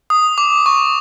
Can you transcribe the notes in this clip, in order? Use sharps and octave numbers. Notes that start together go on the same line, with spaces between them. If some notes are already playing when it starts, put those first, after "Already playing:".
D#6
D6
C#6